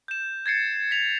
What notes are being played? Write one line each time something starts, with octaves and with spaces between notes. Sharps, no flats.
G6 E7
G#6 A6 C7 C#7
B6 F7